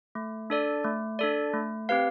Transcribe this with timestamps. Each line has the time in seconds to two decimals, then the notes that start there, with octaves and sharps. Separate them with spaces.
0.15 A3
0.50 D4 A4 D5
0.84 A3
1.19 D4 A4 D5
1.54 A3
1.89 C4 G4 B4 F5